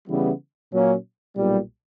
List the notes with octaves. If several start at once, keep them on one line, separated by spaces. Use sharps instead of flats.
C#3 E3 G3 B3 E4
A#2 F#3 A#3 C#4
B1 A#2 G3